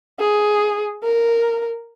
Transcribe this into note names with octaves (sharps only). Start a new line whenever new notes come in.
G#4
A#4